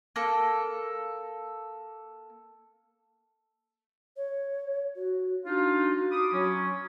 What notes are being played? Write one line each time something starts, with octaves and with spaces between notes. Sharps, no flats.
A#3 A4
C#5
F#4
D4 D#4 F4 F#4
B5 D6 D#6
F#3 C#4